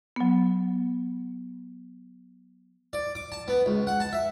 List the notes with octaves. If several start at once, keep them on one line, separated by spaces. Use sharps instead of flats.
F#3 B3
D5
D6
A5
B3
C#2
F#5
A5
E5